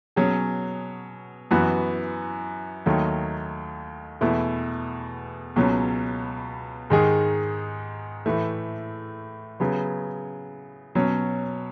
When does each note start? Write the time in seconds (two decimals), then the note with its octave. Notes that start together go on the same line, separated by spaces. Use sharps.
0.16 B2 F#3 C#4 G#4
1.51 F#2 E3 B3 F#4
2.86 D#2 D#3 F#3 A3 D#4
4.21 E2 B2 A3 E4
5.56 C#2 B2 F#3 C#4
6.90 G#2 D#3 G#3 D#4 G#4
8.26 A2 E3 A3
9.60 C#3 F#3 B3
10.95 B2 F#3 C#4